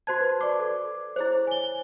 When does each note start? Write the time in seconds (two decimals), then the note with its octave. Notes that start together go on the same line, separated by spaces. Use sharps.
0.07 F#4 C5 A5 C6 G#6
0.20 B4
0.40 F#4 D5 C#6 D6
0.60 A4
1.16 E4 G#4 C5 C#5
1.47 G#5 G7